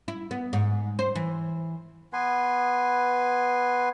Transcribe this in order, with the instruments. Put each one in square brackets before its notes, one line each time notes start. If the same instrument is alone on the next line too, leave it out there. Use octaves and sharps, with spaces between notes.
[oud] E4
B3
G#2
C5
E3
[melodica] B3 B4 G#5 C6